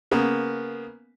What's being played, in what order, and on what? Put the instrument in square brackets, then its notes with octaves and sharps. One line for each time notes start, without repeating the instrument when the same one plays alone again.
[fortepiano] C#3 A#3 B3